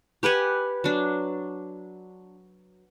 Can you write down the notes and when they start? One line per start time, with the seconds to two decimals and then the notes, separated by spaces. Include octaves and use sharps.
0.23 G4 B4 F#5 G#5
0.84 F#3 D4